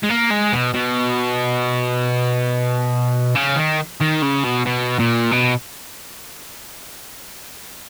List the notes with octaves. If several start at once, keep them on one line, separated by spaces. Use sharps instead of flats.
G#3
A#3
G#3
B2
B2
C#3
D#3
D#3
C#3
B2
B2
A#2
B2